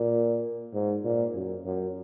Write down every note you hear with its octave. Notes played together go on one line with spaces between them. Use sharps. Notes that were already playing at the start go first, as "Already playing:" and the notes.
Already playing: A#2
G#2
A#2
F#2
F#2